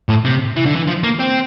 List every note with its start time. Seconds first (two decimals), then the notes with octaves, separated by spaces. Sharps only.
0.09 A2
0.25 C3
0.57 E3
0.66 D3
0.76 E3
0.88 F3
1.03 A#3
1.19 C4